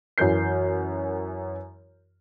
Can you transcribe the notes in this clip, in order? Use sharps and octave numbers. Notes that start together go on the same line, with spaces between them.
F#2 E3 A#4 G6 C7